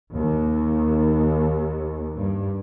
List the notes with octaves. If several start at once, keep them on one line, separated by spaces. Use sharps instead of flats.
D#2
G2